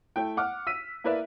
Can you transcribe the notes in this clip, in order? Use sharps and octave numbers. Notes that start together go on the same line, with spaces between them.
A3 E4 G5
F#5 D6 F6
E6 B6 D#7
A#3 E4 A#4 B4 D5 E5